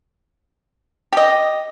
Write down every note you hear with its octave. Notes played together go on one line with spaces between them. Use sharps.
G4 D#5